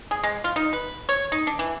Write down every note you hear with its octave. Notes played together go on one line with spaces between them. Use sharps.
G#4
G#3
F4
D#4
B4
C#5
D#4
D4
E3